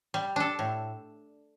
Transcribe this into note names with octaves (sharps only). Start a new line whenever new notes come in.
G3
D4 A4
A2